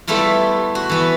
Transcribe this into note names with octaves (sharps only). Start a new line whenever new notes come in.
G3 A3 B3 E4 F4
F#4
E3 B3